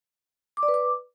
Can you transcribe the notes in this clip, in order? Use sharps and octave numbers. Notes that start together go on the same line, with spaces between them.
D6
D5
B4
D6